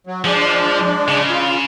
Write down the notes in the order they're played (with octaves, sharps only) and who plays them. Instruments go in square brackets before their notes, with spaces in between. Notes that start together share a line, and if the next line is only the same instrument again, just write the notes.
[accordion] F#3
[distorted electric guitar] F3 [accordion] G#3 D4
[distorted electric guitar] C#3
[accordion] F4